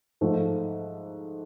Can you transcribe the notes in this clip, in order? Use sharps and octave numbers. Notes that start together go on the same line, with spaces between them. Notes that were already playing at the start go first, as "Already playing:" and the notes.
G#2 F3 A3